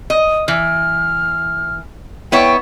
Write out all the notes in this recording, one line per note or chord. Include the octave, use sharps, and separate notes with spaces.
D#5
E3 F6
B3 E4 C#5 G5